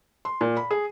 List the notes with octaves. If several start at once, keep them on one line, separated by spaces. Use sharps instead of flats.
C6
A#2
B5
G#4